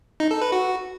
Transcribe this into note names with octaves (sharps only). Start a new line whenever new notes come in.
D#4
A4
B4
F#4